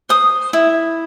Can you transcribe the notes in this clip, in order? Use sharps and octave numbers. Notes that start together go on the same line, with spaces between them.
C5 D#6
E4